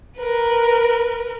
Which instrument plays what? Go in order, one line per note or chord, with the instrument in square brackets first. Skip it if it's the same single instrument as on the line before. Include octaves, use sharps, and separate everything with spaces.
[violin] A#4 B4